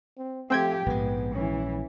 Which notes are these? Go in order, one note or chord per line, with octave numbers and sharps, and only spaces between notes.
C4
F3 A3 C4 G4 G5 G#6
A#1 G#2 G#3 B3
E3 C#4